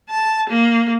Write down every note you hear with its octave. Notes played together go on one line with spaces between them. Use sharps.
A5
A#3